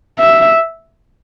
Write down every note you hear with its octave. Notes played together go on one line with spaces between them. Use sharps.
E5